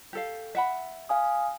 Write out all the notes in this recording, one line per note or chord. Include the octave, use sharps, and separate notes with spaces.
G4 A4 F5
E5 F#5 B5
F5 G#5 D#6